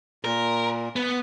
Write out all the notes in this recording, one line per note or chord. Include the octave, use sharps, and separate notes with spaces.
A#2 A#4
B3